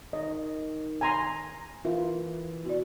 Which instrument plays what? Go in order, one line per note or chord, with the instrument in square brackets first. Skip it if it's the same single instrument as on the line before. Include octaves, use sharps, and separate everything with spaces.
[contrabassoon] D#3 [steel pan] D#5
[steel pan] G#5 A#5 C6
[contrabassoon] E3 [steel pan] F4 [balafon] A#4 E5
[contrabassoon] B2 [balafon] F#4 D5